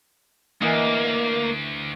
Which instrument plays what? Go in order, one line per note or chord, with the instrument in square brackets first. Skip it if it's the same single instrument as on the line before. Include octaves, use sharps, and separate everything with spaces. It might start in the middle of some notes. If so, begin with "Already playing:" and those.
[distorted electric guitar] D2 [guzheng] E3 D#5 F#5 [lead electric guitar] A#3